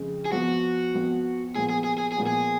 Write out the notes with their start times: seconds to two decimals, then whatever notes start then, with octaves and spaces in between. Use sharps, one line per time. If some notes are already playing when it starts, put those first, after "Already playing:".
Already playing: F2 C#3 G#3
0.25 G#4
0.32 F2 F3 B3 F#4
0.94 F2 F3 B3
1.55 A#2 F3 B3 G#4
1.70 G#4
1.84 G#4
1.98 G#4
2.12 G#4
2.17 A#2 F3 B3
2.27 G#4